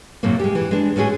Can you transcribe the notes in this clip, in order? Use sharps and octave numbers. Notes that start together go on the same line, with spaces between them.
F#2 A2 C3 A#3
G#3 G4
E3
G#3 D4
A2 G#3 C#4 F#4 G#4